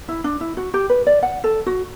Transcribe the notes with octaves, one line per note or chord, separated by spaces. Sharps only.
E4
D4
E4
F#4
G4
B4
D5
F#5
A4
F#4